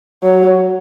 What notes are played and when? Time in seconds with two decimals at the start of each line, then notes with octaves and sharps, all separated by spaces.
0.23 F#3